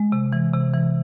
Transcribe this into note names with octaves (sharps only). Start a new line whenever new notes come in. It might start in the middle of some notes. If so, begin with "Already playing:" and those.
Already playing: G#3
C3
E3
C3
E3